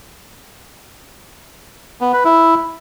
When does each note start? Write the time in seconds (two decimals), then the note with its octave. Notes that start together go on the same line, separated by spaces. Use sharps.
2.01 B3
2.13 B4
2.25 E4